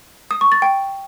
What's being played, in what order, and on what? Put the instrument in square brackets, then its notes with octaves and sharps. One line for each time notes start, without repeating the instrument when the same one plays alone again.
[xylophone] D#6
C#6
A6
G5